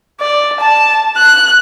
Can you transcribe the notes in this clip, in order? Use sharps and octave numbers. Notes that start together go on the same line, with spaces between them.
D5
A5
F#6